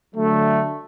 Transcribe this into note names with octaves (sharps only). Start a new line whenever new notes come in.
D3 F#3 A3